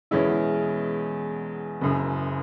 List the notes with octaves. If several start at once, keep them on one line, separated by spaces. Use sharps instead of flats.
E2 B2 G#3 C#4 E4
F#1 F#2 C#3